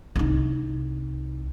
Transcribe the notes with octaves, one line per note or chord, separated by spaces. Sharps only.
C2 D#4